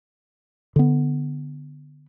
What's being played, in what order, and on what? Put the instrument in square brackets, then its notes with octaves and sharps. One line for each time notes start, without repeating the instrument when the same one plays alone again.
[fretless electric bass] D3 B3